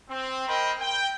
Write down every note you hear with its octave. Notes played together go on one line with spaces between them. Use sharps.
C4
A#4 C5 D#5 G5 B5
G5